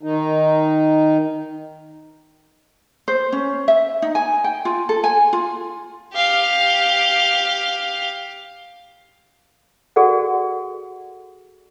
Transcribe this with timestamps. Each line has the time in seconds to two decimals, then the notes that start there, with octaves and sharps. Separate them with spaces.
0.03 D#3 D#4
3.08 C5
3.33 C#4
3.68 E5
4.02 D#4
4.15 G#5
4.44 G5
4.65 F4
4.89 A4
5.04 G#5
5.33 F4
6.13 G4 F5
9.96 F#4 G#4 A4 D5 F#5